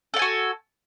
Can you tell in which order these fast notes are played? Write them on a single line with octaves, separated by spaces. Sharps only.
A4 F#5 G#5 F#4